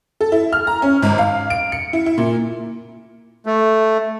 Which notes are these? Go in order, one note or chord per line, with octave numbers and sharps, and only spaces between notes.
A4
E4
F6
A#5
C#4
G#1
F5
D7
C#7
E4
E4
A#2
A3